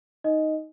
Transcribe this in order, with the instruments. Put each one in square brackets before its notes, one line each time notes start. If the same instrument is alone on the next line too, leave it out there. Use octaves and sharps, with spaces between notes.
[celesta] D#4 D#5